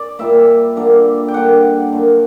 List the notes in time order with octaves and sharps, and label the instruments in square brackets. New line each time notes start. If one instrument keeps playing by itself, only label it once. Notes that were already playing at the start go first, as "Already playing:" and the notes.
Already playing: [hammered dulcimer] D5
A#2 G3 A#3 E5
D3 G3 A#3
G5
D3 G3 A#3 F#5
D3 F#3 A#3